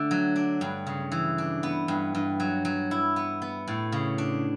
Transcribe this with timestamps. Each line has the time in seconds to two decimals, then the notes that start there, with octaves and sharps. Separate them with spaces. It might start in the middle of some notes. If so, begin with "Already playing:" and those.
Already playing: D3 A3
0.11 F#3
0.36 D4
0.61 G2
0.87 C#3
1.12 E3
1.38 D4
1.63 B3
1.88 G2
2.15 G2
2.40 F#3
2.65 F#3
2.91 E4
3.16 B3
3.42 B3
3.68 A2
3.92 C#3
4.18 D4